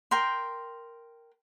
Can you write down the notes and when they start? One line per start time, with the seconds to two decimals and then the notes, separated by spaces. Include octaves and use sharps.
0.11 A#4 G5 C6